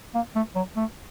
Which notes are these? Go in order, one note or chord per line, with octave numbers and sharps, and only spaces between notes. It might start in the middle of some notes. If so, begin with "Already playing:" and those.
A#3
A3
F#3
A3